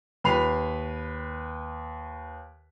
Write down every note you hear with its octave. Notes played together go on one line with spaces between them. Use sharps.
D#2 B4 B5 C7 F7